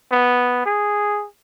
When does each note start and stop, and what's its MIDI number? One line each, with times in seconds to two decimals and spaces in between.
0.12 0.64 59
0.66 1.26 68